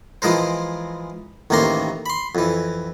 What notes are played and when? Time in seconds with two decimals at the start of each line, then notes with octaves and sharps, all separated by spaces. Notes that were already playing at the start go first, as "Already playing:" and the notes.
0.22 E3 F3 G#3 A#4 C5
1.50 A1 D#2 C3 A#3 A#5 C6
2.06 B5 C6
2.35 F2 E3